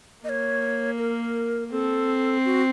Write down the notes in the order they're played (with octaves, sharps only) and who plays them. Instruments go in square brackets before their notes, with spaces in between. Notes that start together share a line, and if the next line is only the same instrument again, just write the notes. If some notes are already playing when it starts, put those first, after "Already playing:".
[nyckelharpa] A#3 [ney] D#5
[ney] C#5
A#4
[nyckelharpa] C4 [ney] A4
[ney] F#4